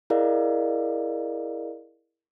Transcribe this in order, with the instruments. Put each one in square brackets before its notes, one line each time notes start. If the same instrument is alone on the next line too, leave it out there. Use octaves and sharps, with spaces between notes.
[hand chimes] E4 G#4 A#4 D5 D#5 F5